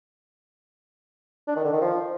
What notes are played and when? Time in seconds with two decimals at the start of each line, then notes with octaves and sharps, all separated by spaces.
1.48 D4
1.56 D#3
1.64 D3
1.73 D#3
1.81 F3